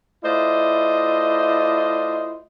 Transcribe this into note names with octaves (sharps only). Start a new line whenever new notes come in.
A3 E4 F4 C5 D5 D#5